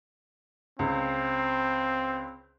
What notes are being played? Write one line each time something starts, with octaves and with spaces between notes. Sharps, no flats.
C#2 C4